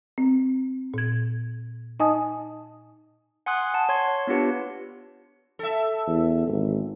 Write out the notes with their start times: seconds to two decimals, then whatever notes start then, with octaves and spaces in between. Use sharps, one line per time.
0.18 C4
0.94 A#2 G#6
2.00 D#4 D#5 G#5 A5 D#6
3.46 F#5 G#5 C6 D#6 F#6
3.74 F#5 A5
3.89 C#5 C6 G#6
4.08 C#5
4.27 B3 D4 F4 G4 B4
5.59 A4 E5
6.07 E2
6.48 G#1